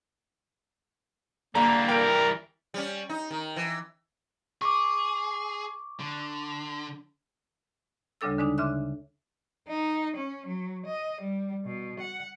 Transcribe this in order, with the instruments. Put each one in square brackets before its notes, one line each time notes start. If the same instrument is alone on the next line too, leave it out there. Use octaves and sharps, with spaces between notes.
[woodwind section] D3 A#3 [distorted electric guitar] E3 G3 [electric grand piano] A#5
[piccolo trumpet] A#4 [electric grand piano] G5 D7
[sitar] G3 C#4
D#4
D#3
E3
[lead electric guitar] G#4 [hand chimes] C#6 D6
[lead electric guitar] D3
[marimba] D2 C#3 G3 D4 A4 E6
D3 G#3 D4 D#4
C#3 E5 C6 D6 F#6
[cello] D#4
C#4
F#3
D#5
G3
B2
F#5